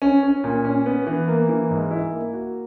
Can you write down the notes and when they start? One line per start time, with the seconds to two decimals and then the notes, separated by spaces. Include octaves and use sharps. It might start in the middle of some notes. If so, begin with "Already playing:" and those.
0.02 C#4
0.23 C#4
0.44 A#2
0.64 C#4
0.86 B3
1.07 E3
1.28 A#3
1.49 E3
1.70 G#2
1.91 E4
2.12 A#3
2.33 F#4